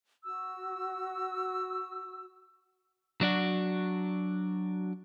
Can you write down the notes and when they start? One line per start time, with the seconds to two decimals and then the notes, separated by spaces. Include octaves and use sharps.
0.24 F#4 E6
3.21 F#3 D4 F#4